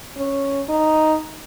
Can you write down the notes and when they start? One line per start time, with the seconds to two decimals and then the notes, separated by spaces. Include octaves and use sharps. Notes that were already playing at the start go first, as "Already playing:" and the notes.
0.18 C#4
0.69 D#4